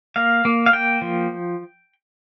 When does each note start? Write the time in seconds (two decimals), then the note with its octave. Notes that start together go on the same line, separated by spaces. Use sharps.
0.16 A#3 F5
0.45 A#3
0.66 F5
0.73 A#3 G5
1.02 F3